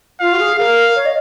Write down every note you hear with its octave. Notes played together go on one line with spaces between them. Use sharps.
F4 F5
F#4
G#4
A#4 F5
C#5
D#5